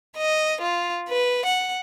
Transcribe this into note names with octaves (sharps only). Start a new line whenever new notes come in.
D#5
F4
B4
F#5